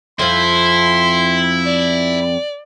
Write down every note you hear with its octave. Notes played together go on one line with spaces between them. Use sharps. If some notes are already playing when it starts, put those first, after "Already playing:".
F2 F3 E4 C6
D5